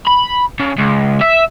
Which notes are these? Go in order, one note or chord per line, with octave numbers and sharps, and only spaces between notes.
B5
C#3
C#2
E5